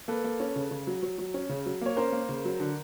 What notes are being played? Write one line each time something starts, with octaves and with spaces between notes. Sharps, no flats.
A#3 A4 B4
A#3
C#4
C#3
C#3
F#3
F#3
F#3
C#4
C#3
F#3
A#3 C#5
C#4 A#4 C5
A#3
C#3
F#3
D3